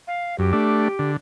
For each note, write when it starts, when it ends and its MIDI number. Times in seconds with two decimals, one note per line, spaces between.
0.07 0.38 77
0.39 0.53 42
0.39 1.11 67
0.53 0.88 57
0.53 0.88 62
0.99 1.17 50